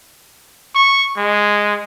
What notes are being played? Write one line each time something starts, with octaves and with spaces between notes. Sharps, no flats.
C#6
G#3